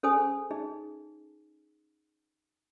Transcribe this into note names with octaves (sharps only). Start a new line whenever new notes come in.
C#4 G#4 A4 C5 G#5 D#6
D#4 G#4 D#5